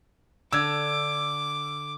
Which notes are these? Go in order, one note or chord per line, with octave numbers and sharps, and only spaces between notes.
D3 D6 E6 G#6